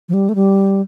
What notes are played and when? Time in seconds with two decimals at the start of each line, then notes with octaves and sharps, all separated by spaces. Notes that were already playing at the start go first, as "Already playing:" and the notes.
0.09 F3
0.14 G3
0.29 A3
0.35 G3